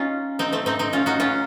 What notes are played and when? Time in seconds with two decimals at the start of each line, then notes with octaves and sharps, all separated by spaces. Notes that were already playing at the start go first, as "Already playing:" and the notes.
Already playing: C#4 D#4 F4
0.39 C4 D#4
0.52 A3 C4
0.66 C4 D#4
0.79 C4 D#4
0.93 C#4 F4
1.06 D#4 F#4
1.20 C#4 F4